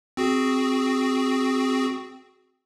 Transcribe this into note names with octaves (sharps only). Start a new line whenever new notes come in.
C4 F#4 G#4